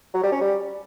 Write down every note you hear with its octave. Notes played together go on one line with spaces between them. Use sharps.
F#3
G3
C#4
G3